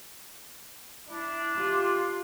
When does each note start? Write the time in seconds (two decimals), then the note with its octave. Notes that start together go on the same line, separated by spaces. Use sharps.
1.07 D4 E4
1.56 F4 G4